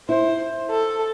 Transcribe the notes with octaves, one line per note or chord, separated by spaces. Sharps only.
E4 C5
A4